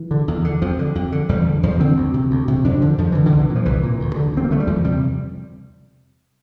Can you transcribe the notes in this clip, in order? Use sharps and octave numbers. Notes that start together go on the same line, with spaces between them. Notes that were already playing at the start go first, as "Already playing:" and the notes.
Already playing: E3
D3
E2
D3
F2 F3
D3
F2
D3
E2 G3
D3
E2 F3
D3 C4
D2
C3
D2
C3
F2 D4
D3 F3
F2 F3
D3 E3
D3
C2
E3
A#2
F3
C2 E3
A#2
D2
D3
D2 C4
A#3
D3 A3
G3
E2 F3
C3 G3